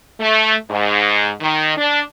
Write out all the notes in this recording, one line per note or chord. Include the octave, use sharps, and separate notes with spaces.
A3
G#2
D#3
D4